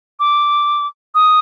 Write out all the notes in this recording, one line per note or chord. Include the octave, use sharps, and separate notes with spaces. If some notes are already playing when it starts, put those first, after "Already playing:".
D6
D#6